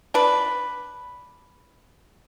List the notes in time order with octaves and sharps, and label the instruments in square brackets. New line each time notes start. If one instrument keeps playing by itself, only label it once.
[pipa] D4 B4